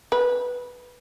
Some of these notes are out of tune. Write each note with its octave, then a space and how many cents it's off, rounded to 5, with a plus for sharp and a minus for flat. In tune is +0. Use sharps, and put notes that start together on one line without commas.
B4 -5